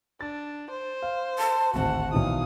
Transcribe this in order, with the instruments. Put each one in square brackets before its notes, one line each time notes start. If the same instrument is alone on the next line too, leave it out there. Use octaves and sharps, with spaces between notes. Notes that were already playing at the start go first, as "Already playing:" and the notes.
[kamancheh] D4 [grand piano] A6
[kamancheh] C5
[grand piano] F5
[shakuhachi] A5
[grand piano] D1 G#1 C5 [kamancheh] F#4 F#5 [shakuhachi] A5
[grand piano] B1 D#3 E3 [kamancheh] F5 D#6